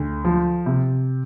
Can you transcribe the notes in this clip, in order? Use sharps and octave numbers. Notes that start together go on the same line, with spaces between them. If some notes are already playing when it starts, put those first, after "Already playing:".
Already playing: D2
F3
C3